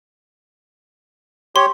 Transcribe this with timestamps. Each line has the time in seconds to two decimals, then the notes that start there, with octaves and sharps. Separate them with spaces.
1.56 G4 C#5 C6